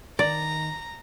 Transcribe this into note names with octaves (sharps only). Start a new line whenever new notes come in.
D#3 D5 A#5